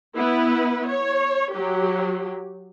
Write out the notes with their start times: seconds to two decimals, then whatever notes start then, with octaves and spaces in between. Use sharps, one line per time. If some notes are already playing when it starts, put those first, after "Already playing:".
0.15 B3 E4 B4
0.87 C#5
1.52 F#3 G4